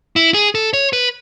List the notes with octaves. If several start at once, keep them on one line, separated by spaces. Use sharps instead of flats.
E4
G#4
A4
C#5
B4